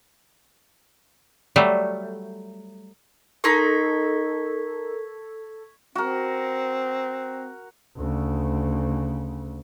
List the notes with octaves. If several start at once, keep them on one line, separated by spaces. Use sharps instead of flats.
F#3 G3 A3
D#4 A4 A#4 C6 C#6 G#6 B6
C4 F#4 A#4
D2 C#3